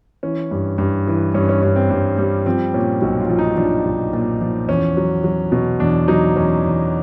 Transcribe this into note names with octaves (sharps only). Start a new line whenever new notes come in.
E3 C#4
G2
G2
E3
G2 C#4
C#4
G2 C#4
C4
G2
G3
F3 C4
A#2 C#4
B1 F#4
F4
F3
D#4
F3 D4
B1
A#2
F3
E2 C#4
F#3
F#3
B2
E2 D4
F#3 D#4
E2 C#4
E2